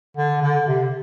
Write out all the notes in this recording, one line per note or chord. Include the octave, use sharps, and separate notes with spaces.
D3
D3
C3